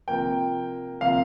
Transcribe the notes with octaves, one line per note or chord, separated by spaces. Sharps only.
C3 F3 A#3 G5
C3 F3 A#3 F5